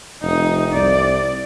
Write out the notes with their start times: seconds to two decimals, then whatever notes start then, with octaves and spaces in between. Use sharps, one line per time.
0.22 F1 D#4
0.72 C2 D5